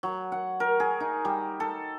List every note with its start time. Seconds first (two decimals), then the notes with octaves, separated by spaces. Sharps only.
0.03 F#3
0.32 F#5
0.60 A#4
0.80 G#4
1.00 D#4
1.25 G3
1.60 A4